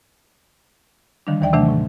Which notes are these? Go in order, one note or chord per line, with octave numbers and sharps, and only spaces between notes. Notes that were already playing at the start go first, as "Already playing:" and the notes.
D3 D#3 F3 G3 D4
D#2 D#3 E3 D5 G5
C3 D#3 E3 F#3 A3 D4
A2